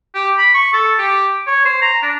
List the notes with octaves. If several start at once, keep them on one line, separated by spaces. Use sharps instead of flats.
G4
B5
C#6
A4
G4
C#5
C5
A#5
D4